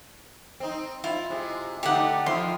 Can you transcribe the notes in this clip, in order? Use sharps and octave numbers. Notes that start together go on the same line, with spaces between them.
C4 D#4
E4 F4
C3 G#3
D3 A3 D#4 G4 D5 F#5
D#3 F3 E4 C6